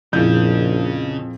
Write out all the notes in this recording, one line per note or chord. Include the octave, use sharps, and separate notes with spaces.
A#1 F2 A#2 C#3 F3 E4 G#4 G6